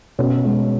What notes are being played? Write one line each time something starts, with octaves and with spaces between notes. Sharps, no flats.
B2 C#4
G#3